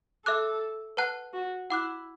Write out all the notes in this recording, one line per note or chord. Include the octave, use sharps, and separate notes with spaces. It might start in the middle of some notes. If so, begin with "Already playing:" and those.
A4 E5 D6 F#6
B4 F#5 A5 F#6
F#4
E4 F#5 D6 F#6